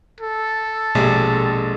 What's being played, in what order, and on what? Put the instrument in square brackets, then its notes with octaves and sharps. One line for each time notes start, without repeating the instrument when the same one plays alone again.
[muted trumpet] A4
[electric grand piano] A#1 G#3 [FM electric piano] B2 G4